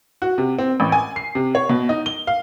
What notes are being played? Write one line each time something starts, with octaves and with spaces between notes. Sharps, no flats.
F#4
C3
C4
A1
G#5
C7
C3
C#5
B2
D#4
G7
F5